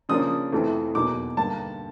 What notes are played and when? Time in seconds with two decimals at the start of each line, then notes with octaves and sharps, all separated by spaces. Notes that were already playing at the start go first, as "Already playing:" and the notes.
0.09 C#3 F3 A#3 D4 D#6
0.52 F2 C3 E3 A3
0.95 E2 B2 F#3 A#3 D#4 D6
1.37 G2 D3 G3 A#3 D#4 A5